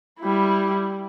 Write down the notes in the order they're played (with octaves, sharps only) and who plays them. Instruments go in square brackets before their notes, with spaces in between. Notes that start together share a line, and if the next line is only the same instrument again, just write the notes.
[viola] G3 E4